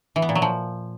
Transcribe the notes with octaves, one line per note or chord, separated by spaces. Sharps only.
E3
B3
A#2
F#3
F3